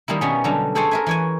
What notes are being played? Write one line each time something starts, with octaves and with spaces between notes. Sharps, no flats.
D#3 G3 A#3 E4
B2 G3 B3 C#4 D#4
D3 F#3 G3 A4
G#4 A4 C5 C#5 G5 G#5
A#4 E5 G#5
E3 C#5 G#5